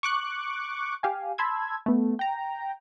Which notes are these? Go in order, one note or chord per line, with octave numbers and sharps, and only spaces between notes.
C#6 D6 F#6
G4 F5 G#5
A5 B5 C6 E6 G#6
A3 B3
G5 A#5